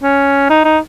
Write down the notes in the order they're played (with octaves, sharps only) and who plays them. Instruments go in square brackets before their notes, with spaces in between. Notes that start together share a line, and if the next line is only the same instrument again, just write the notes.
[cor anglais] C#4
D#4
D#4